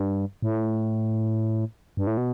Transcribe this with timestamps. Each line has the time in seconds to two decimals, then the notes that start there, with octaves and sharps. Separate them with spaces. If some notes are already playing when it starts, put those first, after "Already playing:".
Already playing: G2
0.42 A2
1.97 G2
2.07 A2
2.17 B2